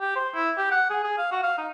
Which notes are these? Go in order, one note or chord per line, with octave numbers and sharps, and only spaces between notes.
G4
C5
E4
G4
F#5
G#4
G#4
F5
F#4
F5
D#4